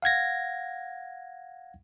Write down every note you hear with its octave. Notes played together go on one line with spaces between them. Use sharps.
F5 F#5 G#6 A#6